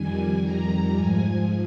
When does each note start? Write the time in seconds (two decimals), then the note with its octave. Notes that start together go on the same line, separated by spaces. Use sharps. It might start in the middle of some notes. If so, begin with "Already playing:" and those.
Already playing: F2 D#3 G3 G#5
0.43 A#5
0.95 G#2 F3 G#5